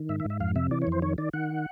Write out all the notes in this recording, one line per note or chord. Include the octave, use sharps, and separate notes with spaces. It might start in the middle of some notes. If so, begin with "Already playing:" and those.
Already playing: D#3
G#2 E5
E5
G#2
E5
F2 F5
C3 E5
E3 D5
C#5
F2
C5
D#3 C#5
D#3 D5
D#3 F#5